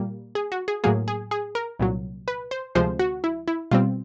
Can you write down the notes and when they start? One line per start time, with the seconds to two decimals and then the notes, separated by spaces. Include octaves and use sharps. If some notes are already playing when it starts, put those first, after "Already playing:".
Already playing: A#2 G3 A#3
0.35 G#4
0.52 F#4
0.68 G#4
0.84 A2 F#3 A#3 G#4
1.08 G#4
1.31 G#4
1.55 A#4
1.79 C2 A#2 F#3
2.28 B4
2.51 C5
2.75 D2 C3 F3 G#3 C5
2.99 F#4
3.24 E4
3.48 E4
3.71 B2 G3 C4 F4